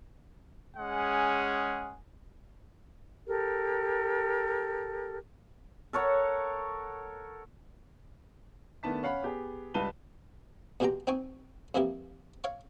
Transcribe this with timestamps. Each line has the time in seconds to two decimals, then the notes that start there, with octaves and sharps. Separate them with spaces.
0.77 G#3 C#4 G#4 F#5
3.26 G4 A4 A#4
5.93 A4 A#4 C#5 F#5
8.83 D#3 A3 B3 D4 A5 B6
9.03 C#4 F5 F#5 B5
9.22 B3 G4 G#4
9.74 C#2 G3 B4 A5 D#7 G7
10.80 E2 B2 G#3 G4 G5 A#5
11.07 C4 D#4 G5 G#5 C#6
11.75 F2 E3 A#3 E4 G4
12.44 C#5 F5 C#6